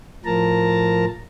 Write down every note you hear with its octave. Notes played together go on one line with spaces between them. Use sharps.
A2 F3 A#4 A5 A#5